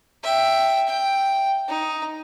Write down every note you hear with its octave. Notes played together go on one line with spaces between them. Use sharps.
E5 G5
G5
D#4